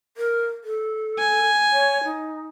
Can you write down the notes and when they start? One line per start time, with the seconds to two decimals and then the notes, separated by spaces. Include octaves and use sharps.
0.17 A#4
0.64 A4
1.19 G#5
1.72 C#5
2.04 D#4